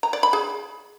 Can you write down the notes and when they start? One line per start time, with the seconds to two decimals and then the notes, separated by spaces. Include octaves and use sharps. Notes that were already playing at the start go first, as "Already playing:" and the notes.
0.03 A#5
0.13 D5
0.23 B5
0.33 G#4